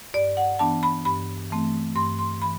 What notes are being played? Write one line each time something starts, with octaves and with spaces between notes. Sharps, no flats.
G2 D5
F#5
E3 B3 D4 A5
B5
G2 B5
E3 A3 C4
G2 C6
C6
E3 B5